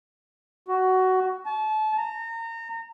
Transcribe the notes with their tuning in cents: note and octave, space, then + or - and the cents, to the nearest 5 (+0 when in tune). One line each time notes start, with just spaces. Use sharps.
F#4 +15
A5 -30
A#5 -30